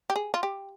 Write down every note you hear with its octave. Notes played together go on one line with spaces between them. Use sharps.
G4
G#4
F4
G4